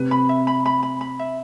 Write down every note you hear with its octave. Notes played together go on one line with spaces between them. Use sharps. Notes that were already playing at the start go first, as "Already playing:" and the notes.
Already playing: C3 B4
B5
E5
B5
B5
B5
B5
E5